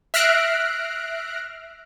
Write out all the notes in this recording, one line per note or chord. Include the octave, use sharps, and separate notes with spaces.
E5 F6 F#6 A#6 C7 D7